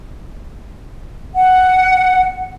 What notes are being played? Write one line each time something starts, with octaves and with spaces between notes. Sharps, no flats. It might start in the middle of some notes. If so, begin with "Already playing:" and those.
F#5